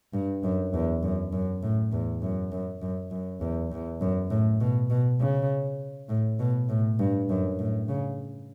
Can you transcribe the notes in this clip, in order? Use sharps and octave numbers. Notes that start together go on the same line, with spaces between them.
G2
F#2
E2
F#2
F#2
A2
E2
F#2
F#2
F#2
F#2
E2
E2
F#2
A2
B2
B2
C#3
A2
B2
A2
G2
F#2
A2
C#3